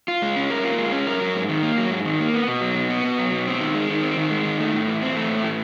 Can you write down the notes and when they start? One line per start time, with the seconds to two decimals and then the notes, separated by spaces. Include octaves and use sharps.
0.08 F4
0.22 G#3
0.37 C#4
0.50 A#4
0.64 F4
0.78 G#3
0.92 C#4
1.07 A#4
1.21 F#3
1.35 G#2
1.49 D#3
1.63 A#3
1.77 F#3
1.91 G#2
2.05 D#3
2.20 A#3
2.33 B3
2.48 B2
2.61 F#3
2.75 B2
2.89 B3
3.04 B2
3.19 F#3
3.32 B2
3.47 C4
3.61 D#3
3.75 G#3
3.89 D#3
4.03 C4
4.17 D#3
4.31 G#3
4.45 D#3
4.60 A3
4.73 A2
4.88 E3
5.02 C4
5.16 A3
5.29 A2
5.44 E3